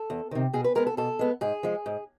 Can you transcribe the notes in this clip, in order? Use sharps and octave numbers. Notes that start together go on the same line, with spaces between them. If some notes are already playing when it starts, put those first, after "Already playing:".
Already playing: A4
E2
C3 D#3
B2 G#4
B4
G#3 B3 A#4
A4
B2 A4
G#3 B3
G#2 G#4
F3 G#3
G#2